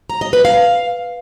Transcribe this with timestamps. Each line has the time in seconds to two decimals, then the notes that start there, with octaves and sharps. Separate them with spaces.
0.10 A#5
0.21 D#5
0.33 B4
0.45 F5